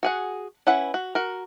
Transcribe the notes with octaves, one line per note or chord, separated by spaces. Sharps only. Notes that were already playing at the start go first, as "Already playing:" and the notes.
F#4 G#4 F#5
C#4 E4 B4 F#5
F#4
F#4 A#4